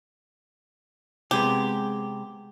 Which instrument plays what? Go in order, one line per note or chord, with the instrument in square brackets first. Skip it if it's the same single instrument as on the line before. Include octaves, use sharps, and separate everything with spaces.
[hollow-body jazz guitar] C3 G#3 B3 [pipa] G4